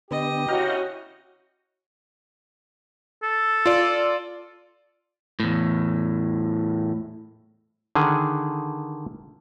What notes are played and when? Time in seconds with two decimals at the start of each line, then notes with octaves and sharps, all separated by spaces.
0.11 D3 B3 G4 D#5
0.48 C#4 E4 F#4 F5 G5 A#5
3.23 A4
3.66 F4 D5
5.40 E2 A2
7.95 D3 D#3 G#4